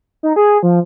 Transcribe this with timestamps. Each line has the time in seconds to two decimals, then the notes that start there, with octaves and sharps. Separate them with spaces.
0.23 D#4
0.36 G#4
0.63 F3